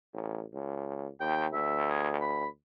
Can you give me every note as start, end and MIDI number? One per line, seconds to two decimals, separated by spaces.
0.14 0.44 33
0.54 1.08 37
1.20 1.48 39
1.20 1.46 79
1.53 2.46 38
1.53 1.90 76
1.91 2.11 68
2.21 2.48 83